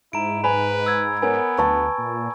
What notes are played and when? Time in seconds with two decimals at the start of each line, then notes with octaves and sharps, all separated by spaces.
0.13 G#2 E4 A#5 D7
0.44 B4 G#5 B5
0.86 E6 G#6
1.22 B3 A#4 B4 C#5 G#5
1.58 D2 B4 A5 C#6
1.98 A#2